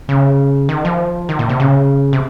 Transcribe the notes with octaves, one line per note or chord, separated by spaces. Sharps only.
C#3
D#3
F3
D#3
A#2
C3
C#3
C3